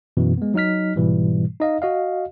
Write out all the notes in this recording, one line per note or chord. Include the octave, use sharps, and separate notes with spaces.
F#2 B2 E3
G#3 B3
F#3 D#4 D#5 F6 B6
G#2 B2 E3 G3
D#4 D#5 F5
F#4 D#5 F5